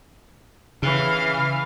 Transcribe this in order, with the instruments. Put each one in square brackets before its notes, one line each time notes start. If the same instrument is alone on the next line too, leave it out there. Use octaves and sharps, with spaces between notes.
[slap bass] C#3 [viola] E3 F5